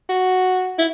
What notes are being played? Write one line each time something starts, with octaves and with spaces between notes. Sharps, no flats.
F#4
E4